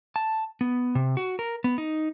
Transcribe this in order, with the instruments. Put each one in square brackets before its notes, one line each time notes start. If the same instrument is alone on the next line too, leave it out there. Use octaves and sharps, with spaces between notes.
[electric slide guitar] A5
B3
C3
F#4
A#4
B3
D#4